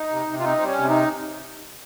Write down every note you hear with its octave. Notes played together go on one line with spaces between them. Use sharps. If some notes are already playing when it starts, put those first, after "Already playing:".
Already playing: D#4
C3
C3
F4
C4 D#4
G3 C4
C#4
C3
D#4